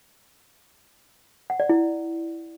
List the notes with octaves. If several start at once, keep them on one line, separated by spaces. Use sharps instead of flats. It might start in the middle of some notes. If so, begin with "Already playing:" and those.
F#5
D5
E4